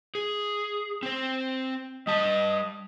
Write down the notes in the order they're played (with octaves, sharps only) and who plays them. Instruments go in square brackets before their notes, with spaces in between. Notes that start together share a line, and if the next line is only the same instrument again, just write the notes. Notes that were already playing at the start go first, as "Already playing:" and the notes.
[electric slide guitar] G#4
C4 C5
[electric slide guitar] G3 A5 [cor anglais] D#5